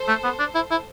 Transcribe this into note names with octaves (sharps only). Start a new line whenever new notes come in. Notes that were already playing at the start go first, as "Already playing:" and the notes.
Already playing: A4 C5
A3
B3
D4
E4
E4